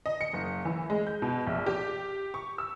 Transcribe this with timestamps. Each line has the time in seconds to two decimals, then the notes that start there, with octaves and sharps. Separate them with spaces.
0.06 D#5
0.21 C#7
0.33 F#1
0.65 E3
0.90 G#3
1.07 G6
1.22 B2
1.47 A#1
1.66 G4
2.34 C#6
2.58 E6